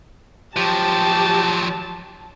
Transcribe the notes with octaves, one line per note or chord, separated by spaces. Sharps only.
F3 F#3 G4 A5